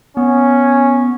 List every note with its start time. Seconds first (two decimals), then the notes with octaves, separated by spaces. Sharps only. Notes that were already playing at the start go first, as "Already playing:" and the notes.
0.17 B3 C#4